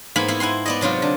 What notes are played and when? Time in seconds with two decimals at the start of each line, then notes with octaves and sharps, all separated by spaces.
0.16 G#2 A#3 B3 G#5 B5
0.28 B3 E4 F5
0.40 E4 F#5 G#5 C6
0.66 B3 D5 D#5
0.81 C3 F#3 D#4 F4
1.02 D3